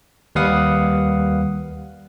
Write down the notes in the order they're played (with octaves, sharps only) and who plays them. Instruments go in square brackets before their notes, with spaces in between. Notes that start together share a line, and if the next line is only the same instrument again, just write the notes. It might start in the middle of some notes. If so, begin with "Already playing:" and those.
[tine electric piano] D#2 G3 B4 F5 F#5 D#6